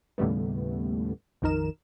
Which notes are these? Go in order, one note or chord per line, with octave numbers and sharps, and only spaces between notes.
D#2 A2 C#3 G3 A3 B3
A#1 F2 D#3 D#4 A#4 E7